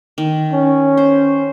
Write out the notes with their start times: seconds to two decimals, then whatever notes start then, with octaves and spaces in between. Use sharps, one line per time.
0.18 D#3
0.53 C#4
0.97 C5